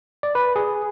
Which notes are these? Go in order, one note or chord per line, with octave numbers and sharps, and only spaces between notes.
D5
B4
G#4